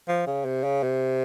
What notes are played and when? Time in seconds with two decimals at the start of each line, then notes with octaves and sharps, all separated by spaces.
0.09 F3
0.27 C#3
0.46 C3
0.64 C#3
0.83 C3